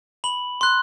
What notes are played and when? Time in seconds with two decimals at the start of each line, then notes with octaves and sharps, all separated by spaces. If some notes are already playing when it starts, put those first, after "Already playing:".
0.24 B5 F#7
0.61 C6 F#6